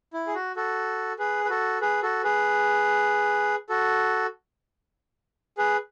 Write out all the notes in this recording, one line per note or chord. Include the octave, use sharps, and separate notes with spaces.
E4
G#4
F#4
F#4 A4
G#4 B4
B4
F#4 A4
G#4 B4
F#4 A4
G#4 B4
F#4 A4
G#4 B4